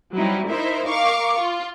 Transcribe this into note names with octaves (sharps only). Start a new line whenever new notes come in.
F#3 G3 C4 D#4 E4
D#4 E4 A#4 C5 E5
A#4 F5 C#6 D6
F4